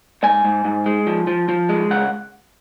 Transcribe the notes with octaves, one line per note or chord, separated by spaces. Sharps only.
G#2 G#5
G#2
G#2
G#3
F3
F3
F3
G#3
C#2 F#5